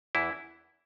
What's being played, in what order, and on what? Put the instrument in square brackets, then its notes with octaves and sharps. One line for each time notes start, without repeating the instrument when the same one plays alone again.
[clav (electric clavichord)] E2 E3 E4